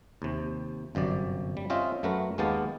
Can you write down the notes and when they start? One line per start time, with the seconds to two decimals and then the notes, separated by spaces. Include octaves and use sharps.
0.22 D#2 C3
0.95 G1 F#2 C3 D5
1.57 G3
1.70 C4 C#4 F4 C5 D#5 E5
2.03 F#2 A3 F#4 A#4 B4
2.38 D#2 G#3 B3 G4 F5 A5